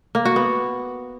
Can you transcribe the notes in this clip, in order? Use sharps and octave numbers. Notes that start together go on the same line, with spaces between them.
A#3
F#4
B3